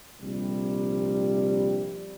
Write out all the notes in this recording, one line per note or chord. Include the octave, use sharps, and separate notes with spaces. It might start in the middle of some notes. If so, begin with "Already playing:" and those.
A#1 C3 G3